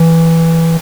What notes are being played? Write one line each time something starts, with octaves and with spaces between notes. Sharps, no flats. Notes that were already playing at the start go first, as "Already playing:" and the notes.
Already playing: E3